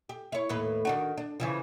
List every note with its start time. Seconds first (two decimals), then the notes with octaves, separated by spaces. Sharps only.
0.09 G4
0.32 E4 C#5
0.49 D#2 A2 B4
0.85 D#3 D4 F#4
1.18 D4
1.40 C#3 E3 F3